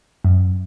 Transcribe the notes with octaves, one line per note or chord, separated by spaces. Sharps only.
F#2